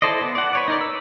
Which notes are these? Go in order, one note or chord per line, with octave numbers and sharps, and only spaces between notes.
E4 A4 C5 D5 D#5
B3
D5 F#5
B4 C#5 D5
D#4 A#4 D5
E6